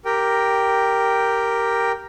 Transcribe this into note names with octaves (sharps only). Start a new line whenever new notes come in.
G4 A#4 G5